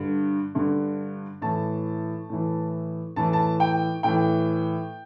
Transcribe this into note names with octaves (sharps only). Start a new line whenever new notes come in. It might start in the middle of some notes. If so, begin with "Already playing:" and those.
Already playing: G2 D3
G2 D3
A2 E3 A5
A2 E3
A2 E3 A5
A5
G5
A2 E3 G5